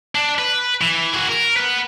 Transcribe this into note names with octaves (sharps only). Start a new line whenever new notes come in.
D4
B4
E3
F#4 G#4
A#4
B3 B4